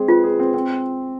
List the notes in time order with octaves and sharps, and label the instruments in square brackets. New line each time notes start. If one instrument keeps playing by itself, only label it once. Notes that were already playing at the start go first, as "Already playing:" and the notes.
Already playing: [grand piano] G#3 C4 G#4
[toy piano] F4 [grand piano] B4
[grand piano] G#4
C4
C4